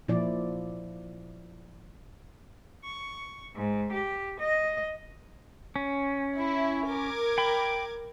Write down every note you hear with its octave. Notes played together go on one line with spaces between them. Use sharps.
A#2 F3 E4 D5
C#6
G#2
G4
D#5
C#4
E4
A#4 D6 G#6
G5 B5